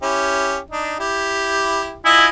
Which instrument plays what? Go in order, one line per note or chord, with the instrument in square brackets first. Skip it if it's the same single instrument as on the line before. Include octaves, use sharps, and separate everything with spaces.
[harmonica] C#4 E4 G4
D4 D#4
E4 G4
[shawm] E4 [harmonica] F4 D#5 G#5